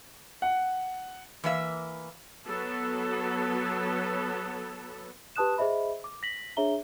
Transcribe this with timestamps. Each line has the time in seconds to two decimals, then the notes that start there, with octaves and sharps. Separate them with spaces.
0.42 F#5
1.44 E3 A#3 E5
2.46 F#3 B3 A4
5.36 G4 B4 A5 D#6 F#6 E7
5.58 G#4 C5 D#5 E5 B5
6.04 D6
6.23 A#6 B6 F#7
6.57 D4 G#4 C#5 E5 A#5 G7